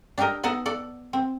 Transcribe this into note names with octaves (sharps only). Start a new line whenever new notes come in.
D4 G4 A4 A#4 D#5
B3 D#4 A4 D#5 F#5 A5
A4 D5 F#5
C4